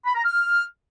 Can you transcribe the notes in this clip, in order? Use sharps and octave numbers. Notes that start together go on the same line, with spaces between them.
B5
A#5
F6